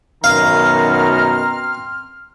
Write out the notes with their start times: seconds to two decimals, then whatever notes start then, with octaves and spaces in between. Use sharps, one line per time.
0.24 F#2 B2 D#3 C4 F5 A#5 C6 F6